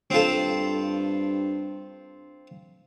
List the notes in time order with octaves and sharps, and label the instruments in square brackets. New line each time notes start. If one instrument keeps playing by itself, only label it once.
[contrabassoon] G2 [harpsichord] C4 F4 A4